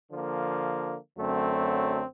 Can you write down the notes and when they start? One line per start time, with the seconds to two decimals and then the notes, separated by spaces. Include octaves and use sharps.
0.10 D3 F3 A#3
1.17 F#2 D3 F#3 A3 C4